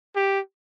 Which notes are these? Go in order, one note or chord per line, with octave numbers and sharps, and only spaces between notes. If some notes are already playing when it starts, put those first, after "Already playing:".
G4